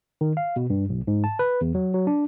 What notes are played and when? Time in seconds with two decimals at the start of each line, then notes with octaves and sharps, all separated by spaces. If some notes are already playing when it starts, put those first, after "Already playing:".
0.21 D#3
0.37 F5
0.56 B2
0.70 G2
0.89 B1
1.07 G#2
1.24 A5
1.39 B4
1.61 E2
1.75 F#3
1.94 F#3
2.07 D4